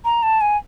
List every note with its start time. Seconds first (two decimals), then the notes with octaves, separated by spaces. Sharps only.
0.05 A#5
0.23 A5
0.41 G#5